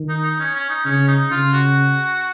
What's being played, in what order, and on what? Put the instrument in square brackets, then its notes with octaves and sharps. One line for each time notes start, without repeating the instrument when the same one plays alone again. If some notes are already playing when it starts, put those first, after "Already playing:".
Already playing: [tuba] D#3
[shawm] D#4
D#4
C#4
C#4
D#4
[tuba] C#3 [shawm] C#4
[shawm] D#4
[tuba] C#3 [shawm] F4
[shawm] F#4